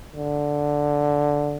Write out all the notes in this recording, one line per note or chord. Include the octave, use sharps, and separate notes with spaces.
D3